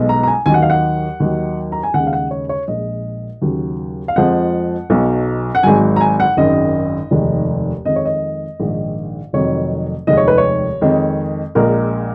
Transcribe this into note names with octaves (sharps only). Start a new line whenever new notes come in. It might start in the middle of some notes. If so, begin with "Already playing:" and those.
Already playing: B1 B2 G#3
A#5
A#5
G#5
D#2 D#3 F#3 G#5
F#5
F5
F#5
D#2 D#3 F#3
A#5
G#5
D#2 C#3 G#3 F#5
F5
F#5
C#5
C#5
A#1 A#2 G#3 D#5
D#2 C#3 F#3
F5
F2 F3 G#3 F#5
B1 B2 F#3
F#5
G#1 G#2 F#3 G#5
A#5
G#5
F#5
G#1 F#2 D#3 G#3 D#5
F1 D#2 D#3 G#3
F2 D#3 G#3 D#5
C#5
D#5
A#1 G#2 D#3 G#3
F1 F2 D#3 F#3 C#5
F1 D#2 D#3 G#3 D#5
C#5
B4
C#5
F2 D#3 G#3
A#1 A#2 G#3 A#4